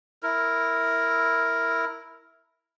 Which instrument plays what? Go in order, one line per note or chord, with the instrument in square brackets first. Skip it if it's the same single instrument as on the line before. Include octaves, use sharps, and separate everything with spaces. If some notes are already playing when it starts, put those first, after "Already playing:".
[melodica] E4 A#4